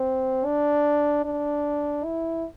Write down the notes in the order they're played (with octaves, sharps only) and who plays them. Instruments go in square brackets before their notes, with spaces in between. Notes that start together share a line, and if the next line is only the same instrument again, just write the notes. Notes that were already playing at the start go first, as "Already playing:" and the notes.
Already playing: [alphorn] C4
D4
D4
E4